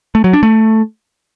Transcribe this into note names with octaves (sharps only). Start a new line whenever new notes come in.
A3
F#3
D4
A3